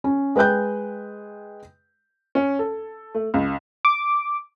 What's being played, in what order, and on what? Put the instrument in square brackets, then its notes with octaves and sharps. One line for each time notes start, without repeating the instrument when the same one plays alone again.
[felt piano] C#4
G#3 B4 G5 F#6 G6
[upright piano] C#4
A4
A3
C#2
[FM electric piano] D6